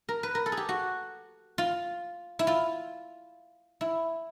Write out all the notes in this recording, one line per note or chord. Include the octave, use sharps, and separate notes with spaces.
A#4
B4
A#4
A4
G#4
G4
F#4
F4
E4
F4
E4